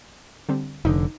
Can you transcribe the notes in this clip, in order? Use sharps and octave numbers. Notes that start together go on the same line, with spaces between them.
D3 G3 C4
F1 A2 D3 D#4